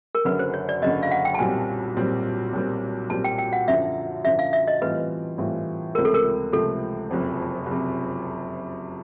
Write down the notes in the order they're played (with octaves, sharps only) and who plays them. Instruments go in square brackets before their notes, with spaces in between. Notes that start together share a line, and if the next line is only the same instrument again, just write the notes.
[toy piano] A#4
[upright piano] F#1 F#2 D3 [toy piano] B4
[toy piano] C5
C#5
D5
[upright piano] F#1 F#2 D3 [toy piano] D#5
[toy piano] F5
F#5
G5
A5
[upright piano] B1 A#2 G3 C4 [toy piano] G#5
[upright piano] B1 A#2 G3 C4
B1 A#2 G3 C4
[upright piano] B1 A#2 G3 C4 [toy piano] A5
[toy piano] G5
G5
F#5
[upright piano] F#2 D3 F3 [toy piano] E5
[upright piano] F#2 D3 F3 [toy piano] E5
[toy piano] F5
E5
D#5
[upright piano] A2 E3 G3 C4 F4 [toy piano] B4
[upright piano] A2 E3 G3 C4 F4
[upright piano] C#2 C3 F3 A3 C4 [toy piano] A#4
[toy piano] A4
A#4
[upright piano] C#2 C3 F3 A3 C4 [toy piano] A4
[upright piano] F#1 F2 C3
F#1
C3